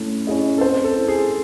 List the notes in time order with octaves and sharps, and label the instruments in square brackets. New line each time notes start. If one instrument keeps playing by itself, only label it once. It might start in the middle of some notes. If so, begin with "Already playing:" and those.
Already playing: [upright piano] A3 C#4 E4
C#4 E4 G#4 D#5
[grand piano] A4
[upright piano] C4 [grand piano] C5
[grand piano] A4
[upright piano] E4 C5
[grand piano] G#4